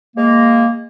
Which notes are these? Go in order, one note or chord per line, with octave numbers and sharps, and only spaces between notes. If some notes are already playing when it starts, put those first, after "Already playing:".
G#3 A#3